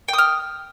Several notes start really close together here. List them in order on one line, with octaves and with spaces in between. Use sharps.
G5 D#6 F6